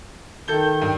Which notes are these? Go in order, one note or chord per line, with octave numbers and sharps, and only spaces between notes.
D#3 A4 G6 G7
G2